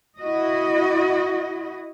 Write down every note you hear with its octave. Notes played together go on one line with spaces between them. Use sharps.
E4 F#4 D#5